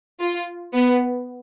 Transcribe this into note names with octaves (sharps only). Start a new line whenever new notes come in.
F4
B3